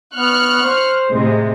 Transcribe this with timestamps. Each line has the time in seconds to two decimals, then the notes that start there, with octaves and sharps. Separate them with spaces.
0.15 B3 C#6 F6 F#6
0.63 C5
1.10 A2 C3 G#3